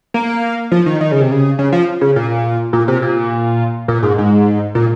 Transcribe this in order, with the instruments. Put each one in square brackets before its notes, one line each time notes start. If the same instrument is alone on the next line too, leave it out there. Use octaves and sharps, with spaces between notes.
[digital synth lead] A#3
F3
D#3
D#3
C#3
C3
C#3
C#3
F3
C#3
A#2
A#2
C3
A#2
A#2
G#2
G#2
A#2